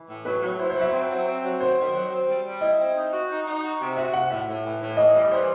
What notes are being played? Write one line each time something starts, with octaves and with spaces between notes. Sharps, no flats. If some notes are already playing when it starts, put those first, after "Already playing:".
Already playing: E3
A2
F#3 B4
F#3
E4 C5
C5
F#3
E5
C4
F#3
C4
F#3
D#3 C5
D#3
F#3
C4
G3
G3
E4 D#5
C4
D#4
F#4
D#4
D#4
F#4
C3
F#4 E5
C3 F#5
A2 E5
A2
E3
A2
E3 D#5
G3
E3 C5